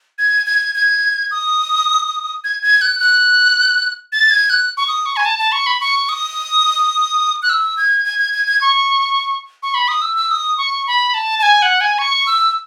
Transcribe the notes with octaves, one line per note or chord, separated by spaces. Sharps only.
G#6
G#6
G#6
D#6
G#6
G#6
F#6
F#6
A6
G#6
F#6
C#6
D#6
C#6
G#5
A5
A5
C#6
B5
C#6
D#6
F#6
E6
G#6
G#6
G#6
G#6
G#6
C#6
C#6
B5
D#6
E6
E6
D#6
C#6
B5
A5
A5
G#5
F#5
G#5
C#6
E6